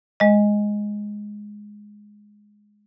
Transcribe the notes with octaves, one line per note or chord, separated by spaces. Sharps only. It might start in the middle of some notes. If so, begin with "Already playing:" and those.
G#3 D#5